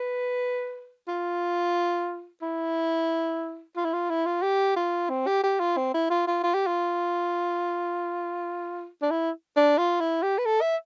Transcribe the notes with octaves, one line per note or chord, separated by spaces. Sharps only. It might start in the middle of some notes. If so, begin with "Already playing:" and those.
Already playing: B4
F4
E4
F4
E4
F4
E4
F4
G4
F4
C4
G4
G4
F4
C4
E4
F4
F4
F4
G4
F4
D4
E4
D4
F4
E4
G4
B4
A4
E5